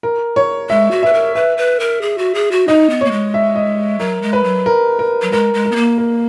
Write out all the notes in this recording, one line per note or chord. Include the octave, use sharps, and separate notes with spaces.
A#4
C#5
G#3 E5
F#4
B4 E5
A#4
B4 E5
B4
A#4
G#4
F#4
G#4
F#4
D#4 D#5
B3
A#3 C#5
G#3
E5
D#5
F#3 A#4
G#3
B4
F#3
A#4
A#4
F#3
G#3 A#4
G#3
A#4
B3
A#3
A#4